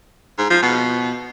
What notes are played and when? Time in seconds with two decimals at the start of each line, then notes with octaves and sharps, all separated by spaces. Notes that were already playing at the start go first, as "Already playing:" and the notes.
0.38 G#2
0.50 F3
0.62 B2